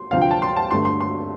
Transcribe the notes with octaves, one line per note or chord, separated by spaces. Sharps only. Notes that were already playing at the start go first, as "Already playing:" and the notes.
Already playing: C6
D2 C3 F3 C4 F5
G5
A5
C6
A5
G2 D3 A3 C6
C6
C6